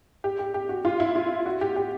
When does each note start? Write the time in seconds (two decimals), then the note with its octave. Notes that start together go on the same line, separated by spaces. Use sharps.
0.24 G4
0.39 G4
0.54 G4
0.69 F#4
0.85 F4
1.00 E4
1.15 F4
1.46 F#4
1.61 G4
1.76 G4